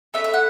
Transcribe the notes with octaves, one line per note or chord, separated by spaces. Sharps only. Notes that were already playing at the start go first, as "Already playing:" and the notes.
A3 C#4 E4 E5
E5
F#5